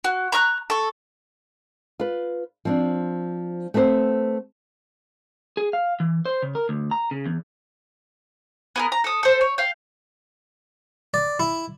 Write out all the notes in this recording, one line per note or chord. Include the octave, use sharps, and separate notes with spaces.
F#4
A#5 C#6 F6 F#6
A4 C#6
F4 B4
F3 C4 D4
A3 B3 C4 A#4 C5
G#4
F5
E3
C5
C#3
A#4
D2
A#5
C#3
E2
B3 G#4 A#4
A#5
A4 D#6
A4 C5
C#5
F5 G5
D5
E4